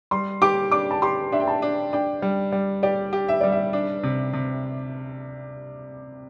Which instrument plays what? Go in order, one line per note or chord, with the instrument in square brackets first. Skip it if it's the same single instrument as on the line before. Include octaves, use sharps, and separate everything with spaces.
[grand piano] G3 [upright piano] C6
[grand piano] G4 [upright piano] D6
[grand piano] D4 [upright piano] D6
[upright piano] A5
[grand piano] G4 [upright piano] C6
[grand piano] D4 [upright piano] E5
[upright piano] G5
A5
[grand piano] D4
[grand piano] D4 [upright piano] G5
[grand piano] G3
G3
[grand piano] G4 [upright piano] D5
[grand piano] G4
[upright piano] E5
[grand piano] G3 [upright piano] D5
[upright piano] E5
[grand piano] D4
C3
C3